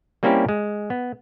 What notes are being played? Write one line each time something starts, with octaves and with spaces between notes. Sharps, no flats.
G3 A#3 C4 C#4 E4 G4
G#3
B3